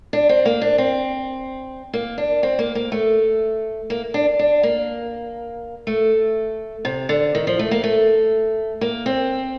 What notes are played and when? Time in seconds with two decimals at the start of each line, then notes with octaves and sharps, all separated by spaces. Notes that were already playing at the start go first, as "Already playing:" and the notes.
0.13 D4
0.29 C4
0.45 A#3
0.62 D4
0.78 C4
1.94 A#3
2.18 D4
2.43 C4
2.59 A#3
2.75 A#3
2.92 A3
3.90 A#3
4.14 D4
4.39 D4
4.63 A#3
5.87 A3
6.85 C3
7.09 D3
7.35 D#3
7.47 F3
7.59 A3
7.71 A#3
7.84 A3
8.81 A#3
9.06 C4